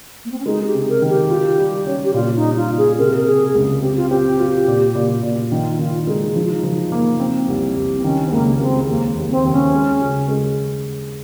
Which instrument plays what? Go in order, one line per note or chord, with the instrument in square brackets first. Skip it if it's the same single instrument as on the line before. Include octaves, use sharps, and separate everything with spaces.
[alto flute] A#3
C4
C#4
[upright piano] G#3 [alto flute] D#4
[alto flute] G#4
G4
[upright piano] C3
[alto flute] A#4
[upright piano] D#3
[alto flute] G4
[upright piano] F4
G3
C#4
[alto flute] G4
[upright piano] A#2 [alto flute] F4
[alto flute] D#4
[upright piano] G3
[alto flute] F4
[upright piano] A#2
[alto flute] G#4
[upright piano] C3 [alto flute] A#4
[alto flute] A#4
[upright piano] C3 [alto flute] G#4
[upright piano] C#2
[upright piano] C4 [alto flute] G4
[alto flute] F4
[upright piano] C4 [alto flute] G4
[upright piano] F4
A#2
A#2
A#2
[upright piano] D#3 [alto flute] F4
[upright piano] D#3 [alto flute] F4
[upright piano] G#3 [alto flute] D#4
[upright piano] F3 [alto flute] D#4
[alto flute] F4
D#4
[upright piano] F3
A#3
C4
C2
C2
[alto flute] C4
[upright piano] D#3 [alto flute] C#4
[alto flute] C4
[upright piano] C#2 [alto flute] A#3
[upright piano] G#3 [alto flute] C4
[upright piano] D#2 [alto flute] A#3
[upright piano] D#2
[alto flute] C4
[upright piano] D#2
[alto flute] C#4
[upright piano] G#3
C#3
G#3